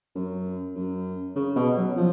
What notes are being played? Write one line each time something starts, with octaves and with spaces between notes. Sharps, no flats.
F#2
F#2
C#3
B2
F#3
F3